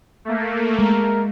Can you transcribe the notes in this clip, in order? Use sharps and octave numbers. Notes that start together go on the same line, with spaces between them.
A3 A#3
G#3 A#4